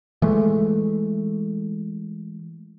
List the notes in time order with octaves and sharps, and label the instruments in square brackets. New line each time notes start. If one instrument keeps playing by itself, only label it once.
[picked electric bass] E3 G#3 A3